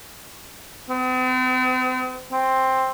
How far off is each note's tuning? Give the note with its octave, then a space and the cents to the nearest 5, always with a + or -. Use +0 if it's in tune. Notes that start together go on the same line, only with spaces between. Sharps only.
C4 -45
C4 +5